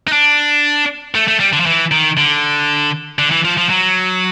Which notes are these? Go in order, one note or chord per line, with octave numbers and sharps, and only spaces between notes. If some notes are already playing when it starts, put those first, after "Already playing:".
D#4
D4
A3
A3
G3
D3
F3
E3
D#3
D3
D3
E3
F3
F3
F#3